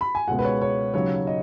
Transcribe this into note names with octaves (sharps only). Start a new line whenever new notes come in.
B5
G#5
C#2 B2 G#3 F#5
B4
C#5
C#5
D#2 C#3 F#3 C#5
D#5